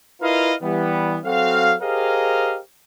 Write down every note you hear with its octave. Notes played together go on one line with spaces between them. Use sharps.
E4 F4 A#4 B4 D#5 F5
E3 G3 B3
F#3 C4 F#4 A4 F5
G4 G#4 A#4 C5 D#5 F5